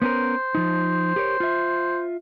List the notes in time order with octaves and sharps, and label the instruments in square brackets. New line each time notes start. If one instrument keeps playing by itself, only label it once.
[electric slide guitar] B3 C#4 A#4 [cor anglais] C5
[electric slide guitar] F3 D#4
G4 A#4 C#5
F4 E5